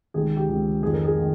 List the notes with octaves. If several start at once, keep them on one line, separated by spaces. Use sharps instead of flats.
C#2 C3 D#3 G#4
G4
C#2 C3 D#3
F2 D#3 G#4
A#4
G#4
D#3